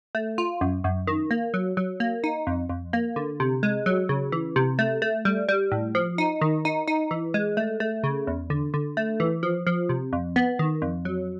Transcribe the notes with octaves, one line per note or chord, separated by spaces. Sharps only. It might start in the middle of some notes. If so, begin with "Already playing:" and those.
A3
F4
F#2
F#2
D#3
A#3
F#3
F#3
A#3
D#4
F2
F2
A#3
D3
C3
G#3
F#3
C#3
E3
C3
A3
A3
G3
G3
A2
F3
D#4
D#3
D#4
D#4
E3
G#3
A3
A3
C#3
E2
D3
D3
A3
E3
F3
F3
C3
F2
B3
D#3
F2
F#3